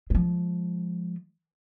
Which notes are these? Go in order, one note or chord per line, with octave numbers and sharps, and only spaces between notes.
F3 G#3